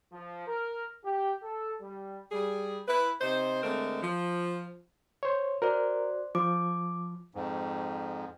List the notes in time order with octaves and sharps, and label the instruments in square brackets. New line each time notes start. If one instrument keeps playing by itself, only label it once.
[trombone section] F3
A#4
G4
A4
G3
[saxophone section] G3 G#4
E4 B4
C3 D#4 C5
D3 G#3 A3 C4 A#4
F3
[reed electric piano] C5 C#5
[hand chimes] F#4 C5 D5 [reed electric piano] A#4
[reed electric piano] F3 [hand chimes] D6
[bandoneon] F2 G#2